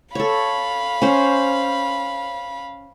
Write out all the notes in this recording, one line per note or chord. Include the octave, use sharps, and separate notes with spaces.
A4 C#5 F5 B5
C#4 C5